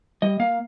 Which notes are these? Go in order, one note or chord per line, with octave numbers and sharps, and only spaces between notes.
G3 D#5
A#3 F5